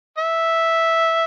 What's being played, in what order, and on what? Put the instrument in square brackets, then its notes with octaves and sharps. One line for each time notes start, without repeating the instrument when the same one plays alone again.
[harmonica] E5